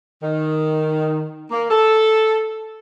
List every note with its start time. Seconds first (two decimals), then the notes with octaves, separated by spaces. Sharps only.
0.22 D#3
1.51 A#3
1.70 A4